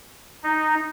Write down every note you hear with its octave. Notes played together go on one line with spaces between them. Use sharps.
D#4